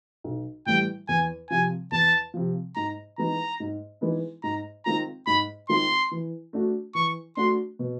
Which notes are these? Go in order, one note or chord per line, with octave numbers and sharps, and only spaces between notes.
B1
A2 E3 G3 G5
E2 G#5
C3 F3 G#5
E2 A5
C3 F3
G#2 A#5
E3 G#3 B3 D#4 A#5
G#2
E3 G#3 B3 D#4
G#2 A#5
D#3 G#3 C4 F4 A#5
G#2 B5
D#3 G#3 C4 F4 C6
E3
A3 D4 F#4
E3 C#6
A3 D4 F#4 C6
B2